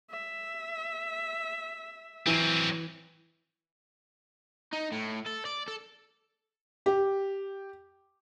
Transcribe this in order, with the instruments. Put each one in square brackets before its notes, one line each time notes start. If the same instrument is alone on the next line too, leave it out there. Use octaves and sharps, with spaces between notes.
[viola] E5
[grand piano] E3 D#7 [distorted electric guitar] F#3 C4
[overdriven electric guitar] D#4
A2
A4
D5
A4
[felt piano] G4